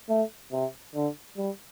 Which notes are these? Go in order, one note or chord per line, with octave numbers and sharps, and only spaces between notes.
A3
C3
D3
G3